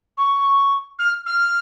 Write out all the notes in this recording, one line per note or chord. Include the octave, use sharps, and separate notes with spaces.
C#6
F6
F6